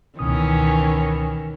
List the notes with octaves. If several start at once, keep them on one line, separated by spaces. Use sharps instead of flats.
C#2 B2 D#3 E3 C#4 D#6